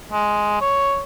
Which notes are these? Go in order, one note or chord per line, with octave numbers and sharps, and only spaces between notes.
G#3
C#5